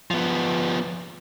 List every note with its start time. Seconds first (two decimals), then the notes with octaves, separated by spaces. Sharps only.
0.11 F3 B3